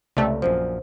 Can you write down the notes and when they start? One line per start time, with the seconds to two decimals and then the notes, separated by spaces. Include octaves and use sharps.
0.17 C#2 C3 A3 D5
0.42 A#1 F#2 F3 C5